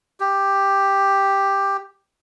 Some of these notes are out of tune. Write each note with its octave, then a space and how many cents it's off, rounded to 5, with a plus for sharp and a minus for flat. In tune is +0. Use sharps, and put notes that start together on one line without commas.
G4 +5